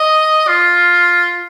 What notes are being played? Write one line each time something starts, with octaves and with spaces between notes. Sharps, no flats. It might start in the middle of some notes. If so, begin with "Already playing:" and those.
Already playing: D#5
F4